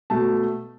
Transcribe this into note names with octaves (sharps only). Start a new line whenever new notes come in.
B2 A3 A5